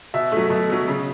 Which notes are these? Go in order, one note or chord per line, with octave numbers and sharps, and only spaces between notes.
B2 E5
A3
F#3
B2
F#3 A3
C#3